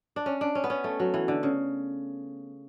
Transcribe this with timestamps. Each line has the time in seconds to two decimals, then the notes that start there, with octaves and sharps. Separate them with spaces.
0.16 D4
0.26 C#4
0.41 D4
0.55 C#4
0.64 B3
0.70 C#4
0.84 A3
1.00 F#3
1.14 E3
1.28 D3
1.43 C#3